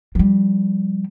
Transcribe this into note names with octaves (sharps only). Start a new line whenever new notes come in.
F3 G3